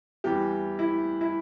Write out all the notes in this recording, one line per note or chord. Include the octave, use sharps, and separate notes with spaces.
E2 E3 G3 G4
E4
E4